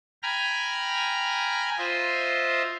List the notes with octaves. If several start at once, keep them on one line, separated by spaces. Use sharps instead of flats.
G5 G#5 A#5 B5 F6
F4 C5 D#5 E5